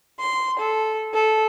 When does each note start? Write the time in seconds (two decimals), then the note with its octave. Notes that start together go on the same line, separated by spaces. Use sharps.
0.20 C6
0.59 A4
1.14 A4